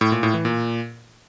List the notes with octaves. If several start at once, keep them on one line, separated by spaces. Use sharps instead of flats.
A2
A#2
A2
E3
A#2